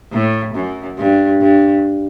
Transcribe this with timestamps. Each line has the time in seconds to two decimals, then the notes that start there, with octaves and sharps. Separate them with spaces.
0.12 A2
0.54 F#2
0.98 G2
1.40 G2